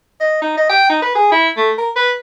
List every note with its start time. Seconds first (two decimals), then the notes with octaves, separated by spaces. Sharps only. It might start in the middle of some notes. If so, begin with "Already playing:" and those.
0.20 D#5
0.42 D#4
0.57 D#5
0.70 G5
0.89 D#4
1.02 B4
1.15 G#4
1.32 E4
1.57 A3
1.78 A#4
1.96 B4